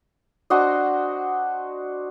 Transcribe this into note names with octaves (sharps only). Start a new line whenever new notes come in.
D4 F#4 C5 D#5